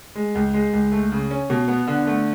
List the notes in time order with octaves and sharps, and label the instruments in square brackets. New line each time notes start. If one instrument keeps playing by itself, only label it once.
[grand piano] G#3
C#2
G#3
C#2
A3
C#3
C#4
B2
B3
D3
A3